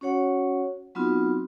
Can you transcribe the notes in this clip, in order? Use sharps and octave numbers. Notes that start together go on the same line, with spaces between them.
C#4 F#4 C#5 F#5
F#3 B3 C4 D#4 F4 F#4